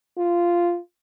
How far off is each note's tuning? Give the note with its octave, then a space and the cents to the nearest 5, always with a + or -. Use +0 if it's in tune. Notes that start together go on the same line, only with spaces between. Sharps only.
F4 -10